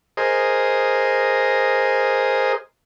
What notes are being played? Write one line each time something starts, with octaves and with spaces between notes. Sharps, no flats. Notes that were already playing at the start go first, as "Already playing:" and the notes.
G#4 A#4 C5 D#5